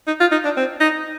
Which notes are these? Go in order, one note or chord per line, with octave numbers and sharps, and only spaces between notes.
D#4
F4
D#4
D4
C4
D#4